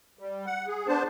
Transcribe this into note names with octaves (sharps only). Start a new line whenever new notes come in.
G3
F#5
G#4
B3 D4 C5 A5